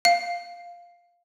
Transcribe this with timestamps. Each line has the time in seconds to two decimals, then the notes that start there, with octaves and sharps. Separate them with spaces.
0.05 F5